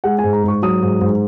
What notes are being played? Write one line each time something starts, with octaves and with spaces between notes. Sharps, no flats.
G#3 F#5
G#5
G#2
A#5
G#2 C#6
F#3 D#6
G#2
G#2